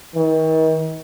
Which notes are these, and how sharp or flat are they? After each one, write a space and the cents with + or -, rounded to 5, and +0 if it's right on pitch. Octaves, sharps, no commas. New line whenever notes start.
D#3 +40